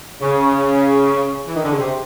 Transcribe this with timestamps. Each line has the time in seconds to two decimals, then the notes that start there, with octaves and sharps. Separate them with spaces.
0.21 C#3
1.47 E3
1.55 D#3
1.63 D3
1.71 C#3
1.78 C3